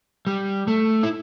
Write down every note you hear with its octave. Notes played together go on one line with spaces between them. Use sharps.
G3
A3
E4